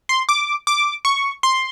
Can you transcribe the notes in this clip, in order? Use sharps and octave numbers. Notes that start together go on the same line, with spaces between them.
C6
D6
D6
C#6
C6